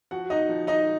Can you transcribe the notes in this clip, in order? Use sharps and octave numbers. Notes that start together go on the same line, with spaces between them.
F3 F#4 F#5
D#4 D#5
F3
D#4 D#5